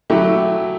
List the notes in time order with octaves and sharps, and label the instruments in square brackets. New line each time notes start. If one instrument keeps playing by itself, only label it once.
[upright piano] F#3 A3 E4 G4